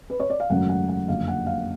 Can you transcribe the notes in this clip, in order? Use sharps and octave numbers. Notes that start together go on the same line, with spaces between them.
B4
C#5
D5
F5
G#1 F#2 C#3 F#3 A3 F#5
F#5
F#5
F#1 F2 D3 F5
F#5
F5